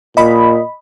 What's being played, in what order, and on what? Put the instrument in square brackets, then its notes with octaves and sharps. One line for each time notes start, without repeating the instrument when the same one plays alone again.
[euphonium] A#2 [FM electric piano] D#5 B5